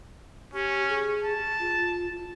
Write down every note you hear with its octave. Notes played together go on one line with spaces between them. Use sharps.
C#4 G4
G#4
A5
F4